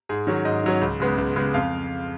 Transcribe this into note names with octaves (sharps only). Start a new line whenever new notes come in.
G#2 G#4
D#3 F#3 C#4
G#2 D#5
D#3 F#3 C#4
C#2
C#3 G#3 B3
C#2
C#3 G#3 B3
F2 F5